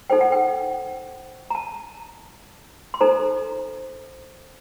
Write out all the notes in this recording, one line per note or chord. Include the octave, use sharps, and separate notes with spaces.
D#4 A4 C5 G5
F#5
G5
A#5
A5
C6
D#4 A4 C5 A#5